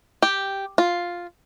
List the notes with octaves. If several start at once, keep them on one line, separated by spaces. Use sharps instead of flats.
G4
F4